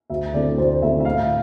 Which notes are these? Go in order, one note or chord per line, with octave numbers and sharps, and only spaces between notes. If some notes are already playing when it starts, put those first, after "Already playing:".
D2 E5
D3 A3 C4 E4 D5
D2 C5
D3 A3 C4 E4 E5
E5
A2 F5